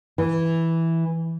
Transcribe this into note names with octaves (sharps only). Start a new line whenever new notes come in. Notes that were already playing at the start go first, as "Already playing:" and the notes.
E3